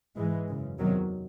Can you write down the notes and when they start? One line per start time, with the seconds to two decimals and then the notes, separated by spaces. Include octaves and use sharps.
0.16 G#2 E3 G#3
0.48 F#2 C#3
0.79 E2 C3 D#3 F#3